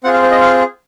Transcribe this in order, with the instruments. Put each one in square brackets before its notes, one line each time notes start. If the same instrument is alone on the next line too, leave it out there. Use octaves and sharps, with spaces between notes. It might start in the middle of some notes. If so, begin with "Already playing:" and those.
[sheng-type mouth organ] C4 F4 G#4 F#5
F5
C5
D#5
F5